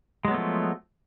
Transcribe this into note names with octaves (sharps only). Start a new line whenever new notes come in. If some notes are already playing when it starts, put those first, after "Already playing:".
F3 F#3 G#3 A3 B3